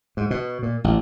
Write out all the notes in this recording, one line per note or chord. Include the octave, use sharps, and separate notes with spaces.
G#2
B2
A#2
A1